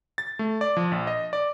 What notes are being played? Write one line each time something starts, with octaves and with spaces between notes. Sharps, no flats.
A6
A3
D5
F3
A#1
D#5
D5